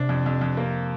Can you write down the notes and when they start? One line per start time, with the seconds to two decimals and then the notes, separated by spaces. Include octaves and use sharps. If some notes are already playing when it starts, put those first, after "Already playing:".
Already playing: C3 D4
0.09 F2
0.26 F2
0.41 F2
0.57 A#3